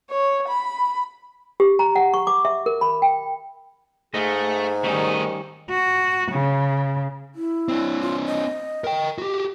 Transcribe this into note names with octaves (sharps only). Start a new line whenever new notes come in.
C#5
B5
G4
A#5
F#5
C#6
D6
E5
A#4
B5
G5
G#2 A3 F4 G#4 D#5
D#3 G3 A3 C#4 D#4 D#5
F#4
C#3
E4
C4 D4
F4
D#5
A#4 G5
F#4 G4